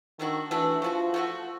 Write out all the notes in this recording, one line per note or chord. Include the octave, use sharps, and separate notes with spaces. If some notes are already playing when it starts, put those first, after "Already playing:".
D#3 A3 D4 F#4
E3 A3 D4 F#4
F3 A3 D4 F#4
A3 D4 F#4